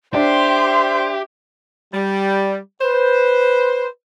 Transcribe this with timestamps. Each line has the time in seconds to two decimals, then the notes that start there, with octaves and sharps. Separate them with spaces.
0.14 D4 G4 C5 E5 C6
1.94 G3
2.82 B4 C5